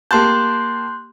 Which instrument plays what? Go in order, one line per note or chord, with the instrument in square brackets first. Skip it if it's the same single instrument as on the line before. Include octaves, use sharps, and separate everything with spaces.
[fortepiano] A#3 G4 A5 [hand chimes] C6 F#6 G6